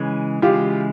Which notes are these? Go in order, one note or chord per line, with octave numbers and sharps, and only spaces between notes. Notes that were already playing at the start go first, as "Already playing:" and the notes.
Already playing: C#3 E3 G#3
C#3 E3 G#3 F4 G4